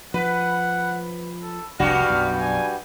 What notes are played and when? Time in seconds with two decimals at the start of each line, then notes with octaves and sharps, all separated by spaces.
0.14 F3 B4 F#5
1.42 A4
1.80 F1 C2 G2 G3 F#4 F5
2.10 B1 F#2
2.41 G#5